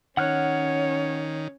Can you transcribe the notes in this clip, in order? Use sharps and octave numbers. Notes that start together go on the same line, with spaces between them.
D#3 C#4 C#5 F#5 F6 F#6